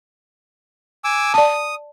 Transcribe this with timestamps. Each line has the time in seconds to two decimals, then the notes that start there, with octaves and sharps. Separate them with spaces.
1.04 G#5 D6 E6
1.34 D5 A5 D#6